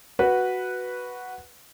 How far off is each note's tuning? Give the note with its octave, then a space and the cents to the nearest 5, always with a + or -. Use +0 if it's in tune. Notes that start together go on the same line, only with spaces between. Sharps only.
F#4 +0 B4 -5